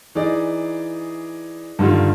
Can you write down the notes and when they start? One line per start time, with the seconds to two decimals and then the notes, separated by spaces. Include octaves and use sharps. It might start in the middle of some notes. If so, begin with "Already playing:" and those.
0.15 E3 D#4 G#4 D5
1.79 G2 D3 D#3 G3 F4